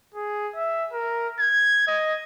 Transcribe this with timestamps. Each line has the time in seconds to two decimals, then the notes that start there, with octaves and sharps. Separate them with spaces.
0.14 G#4
0.56 E5
0.93 A#4
1.39 G#6
1.87 D#5